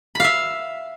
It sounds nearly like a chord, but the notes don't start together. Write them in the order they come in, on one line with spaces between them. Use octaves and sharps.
B5 F5 E5